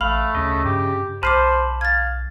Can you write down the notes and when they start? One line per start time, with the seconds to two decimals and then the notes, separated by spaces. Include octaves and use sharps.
0.01 A1 A3 F5 B5
0.35 D2 C#3 D#5
0.65 G2 G4
1.23 B1 C5 A5 B5 D6 F6 C7 D#7
1.81 F5 G#6 A6